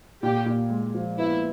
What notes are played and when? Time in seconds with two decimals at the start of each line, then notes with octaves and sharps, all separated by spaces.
0.23 A#2 G4
0.46 A#2
0.70 G#3
0.95 F3
1.18 B3 E4